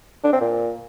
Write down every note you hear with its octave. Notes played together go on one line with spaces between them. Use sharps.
D4
C4
A#2